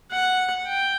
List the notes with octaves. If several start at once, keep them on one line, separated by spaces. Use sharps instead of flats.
F#5
G5